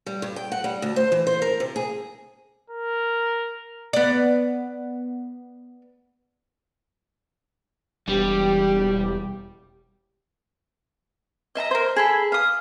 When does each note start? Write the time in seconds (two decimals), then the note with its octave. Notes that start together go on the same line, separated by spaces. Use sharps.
0.06 G3
0.22 G2
0.36 G5
0.52 F#5
0.64 G3
0.82 D2
0.96 C5
1.12 E3
1.27 C5
1.42 A#4
1.60 C3
1.76 G#4
2.70 A#4
3.93 B3 D5
8.08 E1 G3 G4
11.55 D#5 E5 A5 A#5
11.71 A#4 C5
11.96 G#4 A4 B5
12.32 F5 D#6